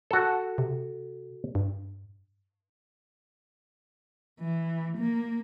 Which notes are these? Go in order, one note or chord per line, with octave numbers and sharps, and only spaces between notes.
F#4 A4
C3
G2
E3
A#3